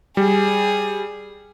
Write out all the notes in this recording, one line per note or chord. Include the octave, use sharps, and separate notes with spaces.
G3 G#4